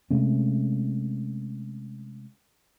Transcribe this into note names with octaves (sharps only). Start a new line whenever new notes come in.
C3 G#3 A3 C#4